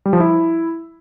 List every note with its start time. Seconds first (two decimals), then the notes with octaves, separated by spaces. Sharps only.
0.06 G3
0.13 F3
0.20 E4